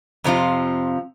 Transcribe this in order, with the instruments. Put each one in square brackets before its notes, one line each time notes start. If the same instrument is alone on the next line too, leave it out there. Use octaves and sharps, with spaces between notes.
[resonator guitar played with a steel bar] F2 C3 F3 C4 F4